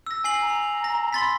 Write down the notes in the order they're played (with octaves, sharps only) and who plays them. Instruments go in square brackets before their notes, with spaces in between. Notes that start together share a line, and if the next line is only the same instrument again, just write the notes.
[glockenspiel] E6 A#6
G#5 C7 F#7
[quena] A#5
[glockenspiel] A#6
[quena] B5 [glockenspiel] C6 A6 B6